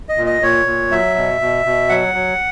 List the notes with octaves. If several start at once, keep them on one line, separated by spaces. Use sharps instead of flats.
D#5
A#2
D#5
A#2 C#5
A#2
F#3 E5
B2
B2
B2
F#3 F#5
F#3